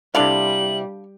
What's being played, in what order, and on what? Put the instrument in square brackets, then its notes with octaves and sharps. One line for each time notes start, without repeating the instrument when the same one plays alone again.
[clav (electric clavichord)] C3 E4 [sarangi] G3 [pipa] D4 A4 F5 [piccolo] F#7